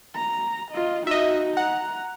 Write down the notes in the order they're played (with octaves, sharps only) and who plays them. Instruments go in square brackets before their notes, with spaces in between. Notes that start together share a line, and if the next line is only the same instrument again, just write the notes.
[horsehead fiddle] A#5
F4 D#5
[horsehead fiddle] D#4 F#4 [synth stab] D#5 E5
[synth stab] F#5 [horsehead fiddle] A#5